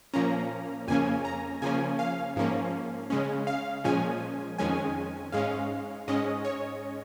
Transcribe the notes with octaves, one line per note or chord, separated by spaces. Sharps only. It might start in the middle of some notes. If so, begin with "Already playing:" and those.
A#2 F3 A#3 C#4 A#5
F2 C#3 A#3 C#4 G#5
A#5
C#3 F3 A#3 C#4 G#5
F5
G#2 F3 A#3 C#4
C#3 G#3 C#4
F5
A#2 F3 G#3 C#4 G#5
F2 D#3 G#3 C#4 G#5
G#2 G#3 C#4 F5
G#2 G#3 C#4 D#5
C#5